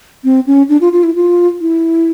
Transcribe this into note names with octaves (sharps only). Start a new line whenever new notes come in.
C4
C#4
D4
F4
F4
E4
F4
E4